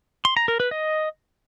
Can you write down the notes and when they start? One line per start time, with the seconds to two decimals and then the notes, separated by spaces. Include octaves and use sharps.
0.25 C6
0.37 A#5
0.48 A#4
0.60 B4
0.71 D#5